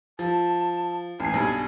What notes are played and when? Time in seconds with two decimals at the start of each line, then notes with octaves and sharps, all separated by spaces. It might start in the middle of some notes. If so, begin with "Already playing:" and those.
0.19 F3 A5
1.20 A1 G#5 C7
1.34 B1 G2